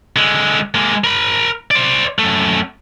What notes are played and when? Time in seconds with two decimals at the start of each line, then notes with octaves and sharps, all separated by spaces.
0.16 D3 G#3
0.75 G#3 A#3
1.04 A#4 B5
1.71 C5 D5
2.19 F#2 A3